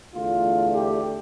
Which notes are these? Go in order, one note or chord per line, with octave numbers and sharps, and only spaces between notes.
E2 D3 A3 F4
G4